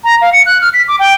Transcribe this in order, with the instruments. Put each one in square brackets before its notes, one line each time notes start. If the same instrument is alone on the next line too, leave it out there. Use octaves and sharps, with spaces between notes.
[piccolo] A#5
F5
C#7
F#6
F6
B6
D6
G5